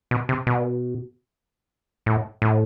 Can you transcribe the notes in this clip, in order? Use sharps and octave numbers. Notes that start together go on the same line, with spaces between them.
B2
C3
B2
A2
A2